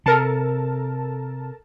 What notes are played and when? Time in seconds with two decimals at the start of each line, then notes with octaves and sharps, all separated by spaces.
0.06 C3 A4 A#4 A5